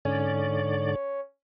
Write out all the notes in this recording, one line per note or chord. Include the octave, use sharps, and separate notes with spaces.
G#2 D3 C#4 D5